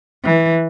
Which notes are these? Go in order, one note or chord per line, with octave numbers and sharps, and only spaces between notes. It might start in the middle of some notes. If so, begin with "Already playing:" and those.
E3